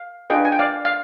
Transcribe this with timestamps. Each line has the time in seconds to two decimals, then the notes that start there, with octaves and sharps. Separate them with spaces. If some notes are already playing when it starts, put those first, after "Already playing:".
Already playing: F5
0.30 D4 F4 G#4 B4 D#5 G5
0.45 G#5
0.52 G5
0.59 D5 F5
0.85 F5